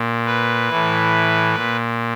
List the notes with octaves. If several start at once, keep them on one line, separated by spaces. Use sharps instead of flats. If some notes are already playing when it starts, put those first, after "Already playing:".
Already playing: A#2
B4
A2 E3
A#2